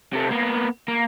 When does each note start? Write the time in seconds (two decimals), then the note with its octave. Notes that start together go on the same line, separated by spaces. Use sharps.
0.13 C3 A3
0.31 A#3 B3
0.88 A#3